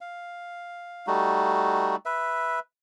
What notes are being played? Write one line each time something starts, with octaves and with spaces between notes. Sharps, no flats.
F5
G3 A3 D#4 F#4
B4 E5